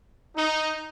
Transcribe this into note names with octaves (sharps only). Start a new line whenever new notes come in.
D#4